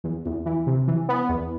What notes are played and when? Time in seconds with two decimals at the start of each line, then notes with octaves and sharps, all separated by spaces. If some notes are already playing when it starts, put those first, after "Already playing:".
0.04 E2
0.26 E2
0.46 E3
0.67 C3
0.88 E3
1.09 B3
1.29 E2